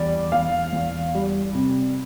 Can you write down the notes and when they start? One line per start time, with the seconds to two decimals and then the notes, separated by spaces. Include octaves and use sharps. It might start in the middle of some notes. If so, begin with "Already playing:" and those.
Already playing: E2 G3 D5
0.32 E2 F5
0.73 E2
1.15 G3
1.55 C3